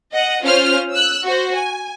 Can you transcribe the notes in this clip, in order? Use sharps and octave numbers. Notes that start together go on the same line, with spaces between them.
D#5 F#5
C#4 F4 C5 F6
E6 F#6
F#4 C5
G#5